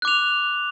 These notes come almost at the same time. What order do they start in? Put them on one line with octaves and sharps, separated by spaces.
F#6 D6 F7